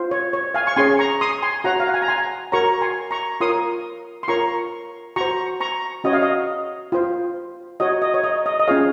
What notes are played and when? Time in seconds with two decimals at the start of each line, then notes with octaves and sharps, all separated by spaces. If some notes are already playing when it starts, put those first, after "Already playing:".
Already playing: F4 C5
0.11 C#5
0.33 C#5
0.54 F5 G#5
0.67 C#6
0.76 C#4 G#4 C#5 G#5 C6
0.99 A#5 C#6
1.21 C6 D#6
1.42 G#5 C6
1.64 F#4 C#5 F#5 A#5
1.80 F5
1.87 F#5
1.94 G#5
2.02 A#5
2.08 G#5 C6
2.52 F#4 A#4 C#5 A#5 C#6
2.82 G#5 C6
3.11 A#5 C#6
3.40 F4 A#4 C#5 C6 D#6
4.23 C6
4.28 F4 A#4 C#5 A#5 C#6
5.16 F#4 C5 A#5 C#6
5.61 A#5 C#6
6.04 C#4 F#4 C#5 D#5
6.13 F5
6.22 D#5
6.92 F4 C5
7.80 F#4 C#5 D#5
8.02 D#5
8.14 C#5
8.24 D#5
8.46 D#5
8.59 D#5
8.67 C#4 F4 G#4 C#5 F5